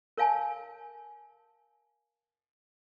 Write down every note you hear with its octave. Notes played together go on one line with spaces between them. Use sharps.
A#4 C#5 F5 G#5 A5